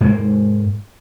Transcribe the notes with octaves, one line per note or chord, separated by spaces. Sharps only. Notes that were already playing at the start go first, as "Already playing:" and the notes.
G#2 G#3 A#3